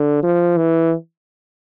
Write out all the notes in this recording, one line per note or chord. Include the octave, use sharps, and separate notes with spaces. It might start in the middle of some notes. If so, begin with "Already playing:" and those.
Already playing: D3
F3
E3